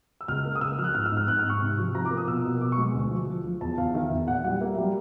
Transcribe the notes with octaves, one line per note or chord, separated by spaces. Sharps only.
E6
C#2 F6
A#3
D#6
C#2 E6
F3 F6
F#6
G#2 F6
E6
G#2
F6
G#2 F#6
F6
G#2
C#6
C3
F3
F3 A#5
D6
A#3
D#6
B2 E6
B2
B2 D6
C#6
G#3
D2
F3
F3
F3
E2 A5
E2 F5
D#3 E5
E2
A#2 F#5
G3 F#5
A#3 E5
G3